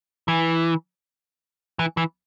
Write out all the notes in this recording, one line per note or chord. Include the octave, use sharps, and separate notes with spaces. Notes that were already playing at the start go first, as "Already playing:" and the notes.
E3
E3
E3